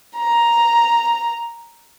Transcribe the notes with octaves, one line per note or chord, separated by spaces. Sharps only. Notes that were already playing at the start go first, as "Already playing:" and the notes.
A#5